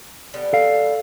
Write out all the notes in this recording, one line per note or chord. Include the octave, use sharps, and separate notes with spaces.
D3 G3 B3
A4 F5